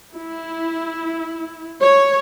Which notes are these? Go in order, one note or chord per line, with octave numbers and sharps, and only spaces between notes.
E4
C#5